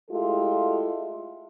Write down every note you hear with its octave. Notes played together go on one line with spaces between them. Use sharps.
G#3 A3 E4 F4 G4 A4